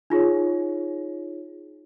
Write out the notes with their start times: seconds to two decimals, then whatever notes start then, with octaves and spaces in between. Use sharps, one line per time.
0.10 D#4 F4 G#4 C#5